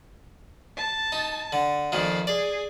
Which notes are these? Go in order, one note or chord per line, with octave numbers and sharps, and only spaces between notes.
A5
D#4
D3
F2 A#2 D#3 F5
G#4 D5